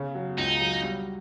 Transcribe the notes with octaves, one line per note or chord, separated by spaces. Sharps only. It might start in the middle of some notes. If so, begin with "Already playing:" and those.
Already playing: C#3
F#3
C#2 D#4
F#3
G3